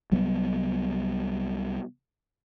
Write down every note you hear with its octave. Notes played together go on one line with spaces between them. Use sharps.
C2 F#3 G3 B3